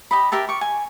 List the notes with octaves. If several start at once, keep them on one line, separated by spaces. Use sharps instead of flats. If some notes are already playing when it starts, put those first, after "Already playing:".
G4 D#5 B5
G4 A#4 E5 A5
C#6 D6
G#5